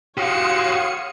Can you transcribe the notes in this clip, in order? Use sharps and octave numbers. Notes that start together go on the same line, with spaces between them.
F#4 G4 C#5 F5 C6 D#6 C#7